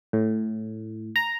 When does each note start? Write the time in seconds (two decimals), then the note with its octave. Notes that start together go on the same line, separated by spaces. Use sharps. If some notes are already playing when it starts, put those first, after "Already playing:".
0.13 A2
1.16 A#5